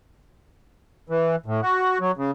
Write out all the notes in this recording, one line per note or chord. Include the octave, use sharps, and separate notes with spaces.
E3
A2
F#4
F#3
C#3